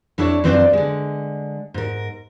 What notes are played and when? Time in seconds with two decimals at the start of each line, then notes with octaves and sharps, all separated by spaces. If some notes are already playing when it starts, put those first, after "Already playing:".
0.18 F2 D4 E4 A4 C#5
0.44 F#2 F3 C4 B4 C5 D5
0.73 D3 G#3
1.74 G#2 A#4